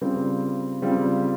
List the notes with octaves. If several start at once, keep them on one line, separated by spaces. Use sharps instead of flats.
C#3 G3 C4 F4
C#3 G3 C4 F4